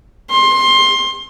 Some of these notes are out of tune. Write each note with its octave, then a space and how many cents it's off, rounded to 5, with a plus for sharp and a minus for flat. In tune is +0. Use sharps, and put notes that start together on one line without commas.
C6 +20